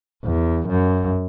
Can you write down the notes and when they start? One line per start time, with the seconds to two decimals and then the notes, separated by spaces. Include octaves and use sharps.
0.25 E2
0.69 F#2